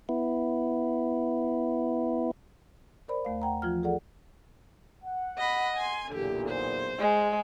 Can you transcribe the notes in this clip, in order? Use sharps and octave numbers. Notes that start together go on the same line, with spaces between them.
B3 E4
A#4 C5 D5 B5
D#2 A3 F5
F#5 G5 A#5
E3 F3 F4 F6
G#4 A4 D5 F#5
F#5
D#5 B5
G#5 C6
B1 E2 A#2 D3 G4
C5
G#3